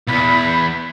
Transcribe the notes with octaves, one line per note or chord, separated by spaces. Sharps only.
B1 E2 B5